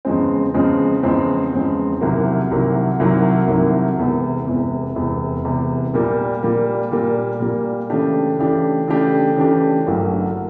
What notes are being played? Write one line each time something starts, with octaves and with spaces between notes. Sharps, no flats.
E2 C#3 F3 G#3 C4
E2 C#3 F3 G#3 C4
E2 C#3 F3 G#3 C4
E2 C#3 F3 G#3 C4
C2 C3 D#3 F#3 A#3
C2 C3 D#3 F#3 A#3
C2 C3 D#3 F#3 A#3
C2 C3 D#3 F#3 A#3
E1 E2 C3
E1 E2 C3
E1 E2 C3
E1 E2 C3
A#2 G3 A#3
A#2 G3 A#3
A#2 G3 A#3
A#2 G3 A#3
C#3 E3 A3 D4 G4
C#3 E3 A3 D4 G4
C#3 E3 A3 D4 G4
C#3 E3 A3 D4 G4
A1 G2 D3 F#3 A#3